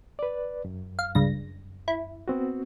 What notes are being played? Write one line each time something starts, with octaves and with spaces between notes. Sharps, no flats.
B4 D5
F#2
F5
C#2 G2 A#6
E4
B3 C4 F#4